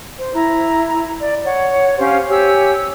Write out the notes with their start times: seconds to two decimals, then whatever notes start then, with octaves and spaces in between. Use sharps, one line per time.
0.19 C5
0.33 E4 A#5
1.19 D5
1.44 C#5 F#5
1.99 C#4 G4 C5 F5
2.29 G4 C#5 G#5 E6